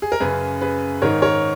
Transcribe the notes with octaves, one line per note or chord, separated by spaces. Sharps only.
G#4
A#4
F#2 C#3 G#4 B4
G#4 B4
G#2 D#3 A#4 C#5
A#4 C#5